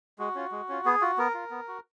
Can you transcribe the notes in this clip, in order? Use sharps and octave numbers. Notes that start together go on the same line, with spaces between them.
G#3 F#4
C#4 F4
G#3
C#4 F4
B3 G#4
F4 F#4
B3 A#4
F4
B3
F#4